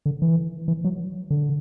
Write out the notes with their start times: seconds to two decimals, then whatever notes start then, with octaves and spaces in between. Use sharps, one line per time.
0.06 D3
0.22 E3
0.68 E3
0.84 F#3
1.30 D3